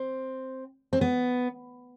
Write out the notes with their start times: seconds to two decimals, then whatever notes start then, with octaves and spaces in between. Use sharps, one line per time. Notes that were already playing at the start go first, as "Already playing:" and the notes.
Already playing: C4
0.93 C4
1.01 B3